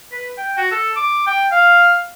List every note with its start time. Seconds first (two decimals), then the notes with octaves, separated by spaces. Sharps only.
0.12 B4
0.38 G5
0.57 F#4
0.71 A4
0.96 D6
1.27 G5
1.52 F5